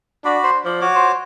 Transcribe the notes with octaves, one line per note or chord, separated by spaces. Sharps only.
D4 F#4 D5 B5
C5
F3 D5
F#4 C#5 D6
C5